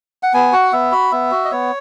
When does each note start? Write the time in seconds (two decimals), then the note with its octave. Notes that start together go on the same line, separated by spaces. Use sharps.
0.23 F#5
0.34 B3 G#5
0.53 F#4 F#5
0.73 B3 E5
0.92 F#4 B5
1.12 B3 E5
1.32 F#4
1.45 D#5
1.52 B3 C#5